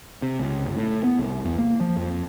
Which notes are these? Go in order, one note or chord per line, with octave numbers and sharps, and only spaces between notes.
C3
C#2
G1
A2
B3
C2
E2
A#3
F3
F2